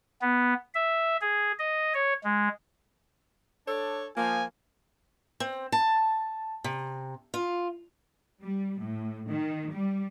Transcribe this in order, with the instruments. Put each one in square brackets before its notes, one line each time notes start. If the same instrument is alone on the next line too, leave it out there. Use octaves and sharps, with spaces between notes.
[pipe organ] B3
E5
G#4
D#5
C#5
G#3
[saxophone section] D4 A4 [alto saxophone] C#5
[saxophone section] F3 [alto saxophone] A#3 [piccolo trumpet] G#5
[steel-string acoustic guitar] C4
A5
C3
F4
[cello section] G3
A2
D#3
G3